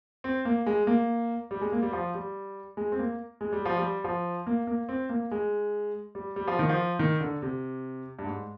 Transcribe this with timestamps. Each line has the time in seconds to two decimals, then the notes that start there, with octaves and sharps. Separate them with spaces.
0.24 C4
0.45 A#3
0.66 G#3
0.87 A#3
1.51 G3
1.61 G#3
1.72 A#3
1.82 G3
1.93 F3
2.14 G3
2.77 G#3
2.92 C4
2.99 A#3
3.41 G#3
3.53 G3
3.65 F3
3.78 G3
4.04 F3
4.47 A#3
4.67 A#3
4.89 C4
5.09 A#3
5.31 G#3
6.15 G3
6.36 G3
6.47 F3
6.59 D#3
6.69 F3
6.99 D#3
7.20 D3
7.42 C3
8.19 G2
8.26 G#2